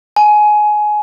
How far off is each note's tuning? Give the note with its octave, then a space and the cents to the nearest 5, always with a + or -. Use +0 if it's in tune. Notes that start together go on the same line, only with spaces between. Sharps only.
G#5 +20